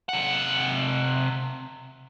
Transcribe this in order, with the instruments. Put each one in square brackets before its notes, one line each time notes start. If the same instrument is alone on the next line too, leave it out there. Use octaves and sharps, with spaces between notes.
[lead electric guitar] C3 F#5